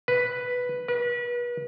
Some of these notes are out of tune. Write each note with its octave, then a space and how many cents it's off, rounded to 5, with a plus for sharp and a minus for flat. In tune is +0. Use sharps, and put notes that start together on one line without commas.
B4 +0
B4 -35